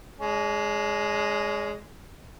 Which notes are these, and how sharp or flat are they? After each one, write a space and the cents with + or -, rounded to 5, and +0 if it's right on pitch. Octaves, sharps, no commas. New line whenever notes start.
G#3 +0 C#4 +45